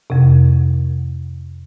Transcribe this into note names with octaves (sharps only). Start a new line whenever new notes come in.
F2 C3